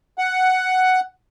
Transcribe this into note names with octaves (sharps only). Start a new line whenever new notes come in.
F#5